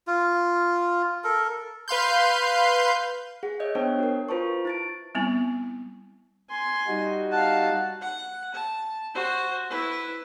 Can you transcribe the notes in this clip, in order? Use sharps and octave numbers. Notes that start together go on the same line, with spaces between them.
F4
A4 A#4
B4 F5 C6 G6
G#4 F#5
C#5 D#5 E5 G6
B3 D4 C5 C#5 G5 A5
F#4 A#4
F4 B4 C5 A5 C#6
E4 A6 D7
G3 B3 C4 E4
G#5 C6
G3 D#4 F#4
F5 F#5 A5
F#5
A5
F#4 C5
E4 B4